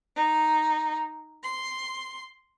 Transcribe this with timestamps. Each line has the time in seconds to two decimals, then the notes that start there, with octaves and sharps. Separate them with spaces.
0.15 D#4
1.43 C6